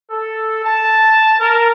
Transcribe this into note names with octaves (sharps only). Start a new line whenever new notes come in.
A4
A5
A#4